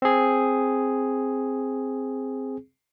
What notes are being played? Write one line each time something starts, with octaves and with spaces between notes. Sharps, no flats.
C4 G#4